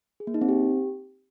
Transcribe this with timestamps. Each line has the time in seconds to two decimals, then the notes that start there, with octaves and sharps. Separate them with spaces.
0.20 G#4
0.27 A#3
0.34 D#4
0.41 C4
0.49 G4